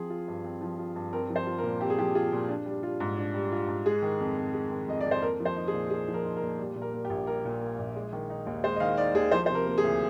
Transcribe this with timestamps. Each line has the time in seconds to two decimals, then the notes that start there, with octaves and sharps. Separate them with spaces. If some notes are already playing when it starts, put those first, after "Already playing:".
Already playing: F3 C4 G#4
0.10 F4
0.28 G2
0.44 C4
0.61 F3
0.79 F4
0.96 G2
1.13 C4 A#4
1.30 F3
1.36 C5
1.47 F4
1.58 A#4
1.63 A#2
1.81 C4 G4
1.90 G#4
1.98 F3 G4
2.15 F4 G#4
2.32 A#2
2.49 D4
2.66 G3
2.83 F4
3.00 G#2
3.17 D4
3.34 G3
3.52 F4
3.68 G#2
3.86 G#3 G#4
4.02 D#3
4.20 F2
4.37 F2
4.54 G#3
4.71 D#3
4.88 F2 D#5
5.01 F2 D5
5.11 C5
5.22 A#3 A#4
5.40 F3
5.45 C5
5.56 D#4
5.68 G#4
5.73 A#2
5.90 A#3 G#4
6.08 F3
6.14 A#4
6.25 D#4
6.37 A#4
6.42 A#2
6.58 G3
6.76 A#2
6.82 A#4
6.93 A#3
7.05 G4
7.10 A#1
7.27 G3 A#4
7.45 A#2
7.61 A#3
7.79 A#1
7.96 G#3
8.13 D#3
8.30 D#4
8.46 D#2
8.63 G#3 C5
8.76 D#5
8.80 D#3 F5
8.97 D#4 D5
9.14 D#2 G#4
9.31 F3 C5
9.46 C3 C5
9.55 A#4
9.66 A#3
9.78 G#4
9.83 D2